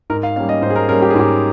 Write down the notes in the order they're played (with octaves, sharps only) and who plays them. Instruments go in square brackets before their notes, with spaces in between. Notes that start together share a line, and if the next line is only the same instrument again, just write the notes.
[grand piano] G#2 A#4
F5
G3 A#3 C#4 F5
D#5
G#2 C5
G#4
A#4
G3 A#3 C#4 A#4
G4
G#4
G#2 G4